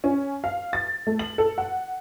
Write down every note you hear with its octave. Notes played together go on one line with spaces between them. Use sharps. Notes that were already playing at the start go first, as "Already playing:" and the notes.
C#4
F5
A6
A3
F#7
A4
F#5